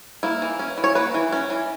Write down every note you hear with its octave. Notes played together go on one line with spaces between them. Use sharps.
A#3 E4
E3
C#4
E3
C#5
A#3 B4
E3
C#4
E3